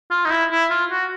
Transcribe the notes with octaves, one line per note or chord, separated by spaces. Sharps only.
F4
D#4
E4
E4
F4
F#4